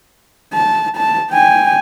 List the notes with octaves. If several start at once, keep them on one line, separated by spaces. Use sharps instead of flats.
A5
A5
G5 G#5